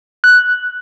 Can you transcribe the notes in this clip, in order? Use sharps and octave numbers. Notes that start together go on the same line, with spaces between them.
F#6